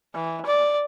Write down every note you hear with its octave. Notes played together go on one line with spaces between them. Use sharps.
E3
D5